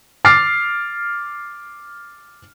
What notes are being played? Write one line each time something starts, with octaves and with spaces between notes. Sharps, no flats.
D6 F6 A6 C7